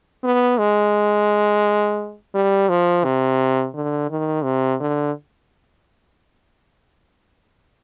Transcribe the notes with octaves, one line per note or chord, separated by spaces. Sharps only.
B3
G#3
G3
F3
C3
D3
D#3
C3
D3